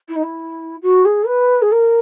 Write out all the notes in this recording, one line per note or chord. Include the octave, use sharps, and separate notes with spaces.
E4
D#4
E4
F#4
G#4
B4
G#4
A#4